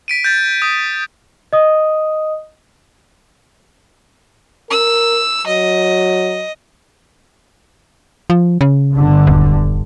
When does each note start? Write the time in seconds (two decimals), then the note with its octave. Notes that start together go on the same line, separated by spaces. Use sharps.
0.08 B6 D7 D#7
0.24 G6 A6
0.62 D#6
1.53 D#5 D#6
4.71 A#4 E6
5.47 F#3 D#5
8.30 F3
8.61 C#3
8.94 G1 D3
9.27 D#1